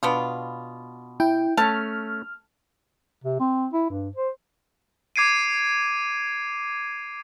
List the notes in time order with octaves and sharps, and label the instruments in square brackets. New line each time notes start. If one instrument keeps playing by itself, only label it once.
[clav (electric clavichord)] B2 [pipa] B3 D4 F4
[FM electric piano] E4 G5
[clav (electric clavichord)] A3 C#4 [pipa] A5 [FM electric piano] F6
[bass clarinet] C3
C4
E4
G2
C5
[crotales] D6 G#6 C7 D7 D#7